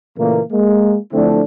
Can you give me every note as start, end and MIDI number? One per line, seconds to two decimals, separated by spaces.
0.18 0.40 46
0.18 0.40 49
0.18 0.40 52
0.18 0.40 57
0.18 0.40 58
0.51 0.97 56
0.51 0.97 58
1.13 1.42 50
1.13 1.42 53
1.13 1.42 57
1.13 1.42 60
1.13 1.42 62
1.13 1.42 64